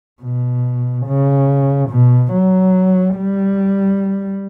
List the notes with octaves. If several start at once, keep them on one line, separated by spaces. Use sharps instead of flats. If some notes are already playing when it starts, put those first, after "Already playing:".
B2
C#3
B2
F#3
G3